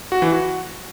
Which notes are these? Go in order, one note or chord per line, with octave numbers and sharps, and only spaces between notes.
F#4
E3
F#4